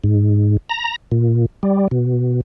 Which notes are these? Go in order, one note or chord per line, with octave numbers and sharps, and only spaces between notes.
G#2
A#5
A#2
G3
B2